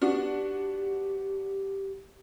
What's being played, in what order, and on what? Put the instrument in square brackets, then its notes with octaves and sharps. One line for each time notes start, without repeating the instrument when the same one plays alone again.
[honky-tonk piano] B3 D4 F#4 [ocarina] G4